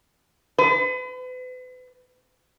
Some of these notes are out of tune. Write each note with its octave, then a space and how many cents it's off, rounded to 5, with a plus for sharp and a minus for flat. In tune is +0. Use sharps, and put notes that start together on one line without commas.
B4 +40